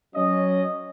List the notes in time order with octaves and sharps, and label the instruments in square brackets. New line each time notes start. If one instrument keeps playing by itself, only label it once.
[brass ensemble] F#3 C#4 D#5